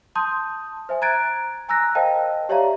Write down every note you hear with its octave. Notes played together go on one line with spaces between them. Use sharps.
A5 C6 D#6 G6
C5 E5 G#5
A#5 F#6 G#6 A6 D7
G#5 A#5 E6 F#6 A#6
A#4 C5 D#5 F5 G5 A5
G4 C#5 D5 E5 F5 A#5